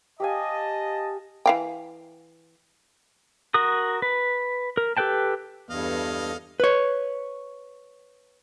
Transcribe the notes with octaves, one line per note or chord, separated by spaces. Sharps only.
G4 D#5 F5 G#5 A5
E3 F5 G5
F#4 A#4 D#6
B4
A#4
G4 A4 B4 G5 A5
E2 G2 A4 D#5 F5
B4 C#5